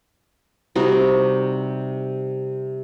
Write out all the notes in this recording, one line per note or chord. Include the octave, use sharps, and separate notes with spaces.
C3 G3 D#4 F#4